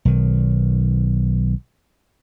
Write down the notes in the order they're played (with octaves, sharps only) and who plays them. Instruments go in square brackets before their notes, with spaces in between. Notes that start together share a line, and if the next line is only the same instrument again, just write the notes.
[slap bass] B1 D#3